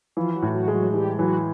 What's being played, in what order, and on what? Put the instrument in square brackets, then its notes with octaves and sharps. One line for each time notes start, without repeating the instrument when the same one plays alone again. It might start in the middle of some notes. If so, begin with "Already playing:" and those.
[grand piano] E3 [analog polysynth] F3 F4
[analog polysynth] F#3 F#4
[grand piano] A2
[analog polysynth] F#3 F#4
[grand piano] G#3
[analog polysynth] F#3 F#4
[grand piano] E3 [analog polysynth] G3 G4
[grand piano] E3 [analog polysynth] F#3 F#4